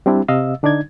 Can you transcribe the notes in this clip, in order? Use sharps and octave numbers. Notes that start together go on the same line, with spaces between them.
G3 C4 D4 E4
C3 D#5 F5 E6
D3 D4 D#4 D5 G#6